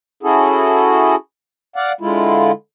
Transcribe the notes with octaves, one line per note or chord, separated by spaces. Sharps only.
C#4 E4 F#4 G#4 A4
D5 F5 F#5
D3 G#3 E4 F4